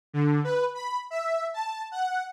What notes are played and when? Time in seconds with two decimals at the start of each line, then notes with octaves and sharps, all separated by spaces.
0.13 D3
0.44 B4
0.74 B5
1.11 E5
1.54 A5
1.92 F#5